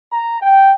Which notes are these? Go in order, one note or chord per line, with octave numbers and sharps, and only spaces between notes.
A#5
G5